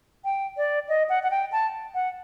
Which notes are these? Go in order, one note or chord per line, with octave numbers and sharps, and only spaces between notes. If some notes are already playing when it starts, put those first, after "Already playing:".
G5
D5
D#5
F#5
F#5
G5
A5
F#5